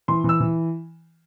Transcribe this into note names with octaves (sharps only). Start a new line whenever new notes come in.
E3 C6
E3 E6
E3